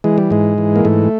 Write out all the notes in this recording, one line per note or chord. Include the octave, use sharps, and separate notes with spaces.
E3 G#3
G3
G#2 G#3
E3
A#3
G#2 A3